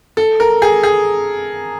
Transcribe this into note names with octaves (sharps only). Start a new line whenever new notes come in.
A4
A#4
G#4
G#4